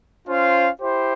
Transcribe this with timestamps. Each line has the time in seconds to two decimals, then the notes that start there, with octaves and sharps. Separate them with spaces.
0.26 C#4 F4 C5 F5
0.80 E4 G4 C5